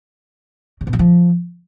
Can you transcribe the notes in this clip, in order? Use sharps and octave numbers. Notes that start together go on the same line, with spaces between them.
C#3
B2
F#3
F3